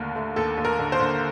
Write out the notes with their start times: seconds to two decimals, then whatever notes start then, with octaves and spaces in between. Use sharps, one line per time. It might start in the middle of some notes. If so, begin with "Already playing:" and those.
Already playing: D#2 D3 A3 A#4
0.16 A3
0.36 D#2 A4
0.57 D#2
0.65 A#4
0.79 D3
0.92 C5
1.00 D3